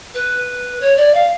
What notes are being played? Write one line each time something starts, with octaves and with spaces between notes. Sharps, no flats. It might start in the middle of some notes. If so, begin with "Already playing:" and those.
B4
C#5
D5
F5